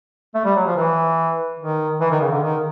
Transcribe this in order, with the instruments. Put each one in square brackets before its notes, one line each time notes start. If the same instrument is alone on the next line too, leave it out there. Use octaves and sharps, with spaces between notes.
[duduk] A3
G3
F#3
F3
E3
D#3
E3
D#3
C#3
D3
D#3